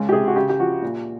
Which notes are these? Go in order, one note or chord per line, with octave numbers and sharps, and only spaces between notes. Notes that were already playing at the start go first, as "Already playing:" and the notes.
Already playing: C#2
G4
C3 G#4
F#4
C#3 G4
G4
F3 F#4
A#2